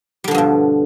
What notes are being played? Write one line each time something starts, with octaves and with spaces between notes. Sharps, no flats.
G2 B2 D3 F3 G3